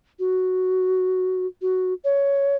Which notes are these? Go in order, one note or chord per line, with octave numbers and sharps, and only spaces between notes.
F#4
F#4
C#5